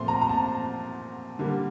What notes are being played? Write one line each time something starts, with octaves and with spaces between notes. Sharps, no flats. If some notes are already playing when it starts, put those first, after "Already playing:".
Already playing: A#2 F3 A3 C4 C6
A#5
A#5
A5
D3 G3 A#3